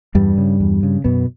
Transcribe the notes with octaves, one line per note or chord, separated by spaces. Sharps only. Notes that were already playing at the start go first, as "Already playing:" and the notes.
E2 G2 G3
C#3
E2
C#3
F#2 B2 B3